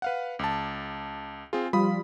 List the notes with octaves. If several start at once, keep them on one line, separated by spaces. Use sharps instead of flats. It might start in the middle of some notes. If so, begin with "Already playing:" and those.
B4 F5 F#5
C#2 A5
C4 F4 G#4
F3 G3 F4 B5 D#6